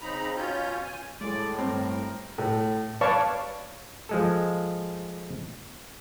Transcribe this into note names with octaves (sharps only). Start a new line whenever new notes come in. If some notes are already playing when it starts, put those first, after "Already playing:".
C#3 C4 D#4 A#5 B5
B2 C#4 F4 C#5 G6
G#5
A2 G#3 D5
G2 C4 A#4
A2
B4 C#5 D5 F5 A5 C#6
F3 G#3 A4